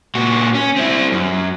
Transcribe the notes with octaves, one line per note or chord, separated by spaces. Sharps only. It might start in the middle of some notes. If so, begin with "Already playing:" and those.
A#2 F#4
C#4
C4 E4
F#2